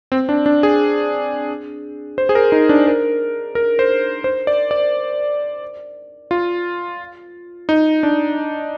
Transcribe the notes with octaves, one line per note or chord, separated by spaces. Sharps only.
C4
D4
D4
G#4
C5
G#4
A#4
D#4
D4
A#4
A#4
C5
C5
D5
D5
F4
D#4
D4